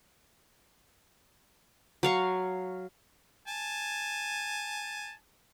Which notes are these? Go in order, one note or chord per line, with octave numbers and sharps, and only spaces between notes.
F#3 F5 C#6
G#5 A5